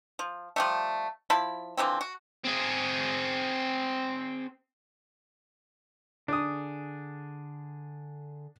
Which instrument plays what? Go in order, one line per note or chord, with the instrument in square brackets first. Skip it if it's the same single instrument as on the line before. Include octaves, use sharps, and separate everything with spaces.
[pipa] F3
F3 G3 A3
F3 E4 A5 B5
D3 E3 F3 C4
F#4
[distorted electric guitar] C4 G#4
[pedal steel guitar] D3 G#4 [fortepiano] D4 D#6